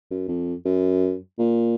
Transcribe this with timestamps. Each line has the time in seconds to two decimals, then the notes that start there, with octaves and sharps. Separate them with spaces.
0.11 F#2
0.28 F2
0.65 F#2
1.39 A#2